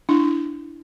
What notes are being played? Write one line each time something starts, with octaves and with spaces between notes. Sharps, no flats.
D4 E4